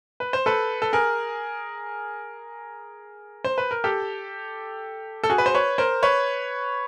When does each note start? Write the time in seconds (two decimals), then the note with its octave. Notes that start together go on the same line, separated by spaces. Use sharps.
0.20 B4
0.33 C5
0.46 A4 B4
0.82 A4
0.93 G#4 A#4
3.44 C5
3.58 B4
3.71 A#4
3.84 G4 A4
5.24 A4
5.30 F#4 G#4
5.38 B4
5.46 C5
5.54 B4 C#5
5.78 A#4 C5
6.03 B4 C#5